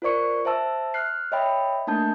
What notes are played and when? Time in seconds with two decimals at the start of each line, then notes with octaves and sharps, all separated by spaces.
0.02 F4 A#4 C5 D5 C#6 C#7
0.45 C5 E5 A5 E6
0.94 F6 F#6 C7
1.32 C#5 D#5 E5 G5 B5
1.87 A3 A#3 D4 A5 G6